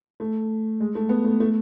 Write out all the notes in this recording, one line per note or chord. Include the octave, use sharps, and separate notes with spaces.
A3
G#3
A3
B3
A3
A3